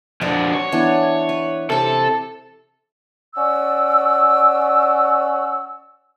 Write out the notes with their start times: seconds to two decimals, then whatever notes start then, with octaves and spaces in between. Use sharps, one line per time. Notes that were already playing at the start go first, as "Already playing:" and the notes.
0.21 F2 D4 D5 F#5 A#5
0.54 C#5
0.72 E3 B3 D4
1.29 B4
1.70 C3 A4 A5
3.36 C#4 D5 F#5 E6